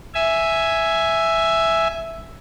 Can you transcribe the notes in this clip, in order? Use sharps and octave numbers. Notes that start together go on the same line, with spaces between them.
E5 G#5